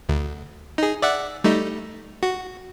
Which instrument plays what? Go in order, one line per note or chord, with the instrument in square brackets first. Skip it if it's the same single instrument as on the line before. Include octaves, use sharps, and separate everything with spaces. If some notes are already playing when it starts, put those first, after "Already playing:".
[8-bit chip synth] D2
D#4 G#4
D5 E5 F#5
G3 A3 D#4
F#4